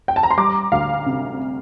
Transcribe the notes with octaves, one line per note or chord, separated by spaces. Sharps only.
G5
A5
A#5
C6
G3 A#5 D6
D2 F5
C3